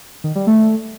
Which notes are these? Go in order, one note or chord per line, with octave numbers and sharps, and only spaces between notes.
D#3
G3
A3